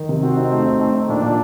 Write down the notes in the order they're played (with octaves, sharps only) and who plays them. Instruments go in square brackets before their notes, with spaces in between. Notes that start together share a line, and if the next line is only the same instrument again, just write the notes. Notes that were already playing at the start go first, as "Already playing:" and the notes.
Already playing: [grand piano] D#3
C3
[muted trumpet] C4 [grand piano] F#4
[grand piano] D#4
A3
D#4
A3
D#4
[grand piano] A#2 [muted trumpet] D4
[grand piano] A#2